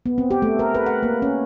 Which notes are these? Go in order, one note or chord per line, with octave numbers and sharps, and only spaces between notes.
B3
C4
G4
A3
A#4
B4
F#5
A#3
C#4